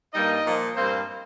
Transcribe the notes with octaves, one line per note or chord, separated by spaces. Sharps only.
G2 G3 A#3 D#4 D#5
A#2 F3 A#3
G2 G3 A#3 C4 C5